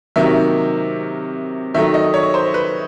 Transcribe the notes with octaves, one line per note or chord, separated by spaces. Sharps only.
C3 D#3 F#3 A#3 E5
D#3 F#3 A3 E5
D#5
C#5
C5
B4